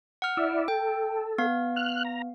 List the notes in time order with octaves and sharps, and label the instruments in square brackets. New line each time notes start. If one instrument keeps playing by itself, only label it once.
[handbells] F#5 F6
[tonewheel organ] E4 D5 E5
[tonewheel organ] A4 [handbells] G5
[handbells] B3 F5
[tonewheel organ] F6 F#6
A#5